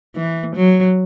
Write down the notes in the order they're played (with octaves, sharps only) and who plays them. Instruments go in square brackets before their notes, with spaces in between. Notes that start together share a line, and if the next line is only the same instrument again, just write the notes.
[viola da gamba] E3
F#3